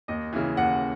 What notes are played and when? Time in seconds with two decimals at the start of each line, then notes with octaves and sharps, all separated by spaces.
0.08 D#2 D#5
0.32 C#3 E3
0.57 D#2 F#5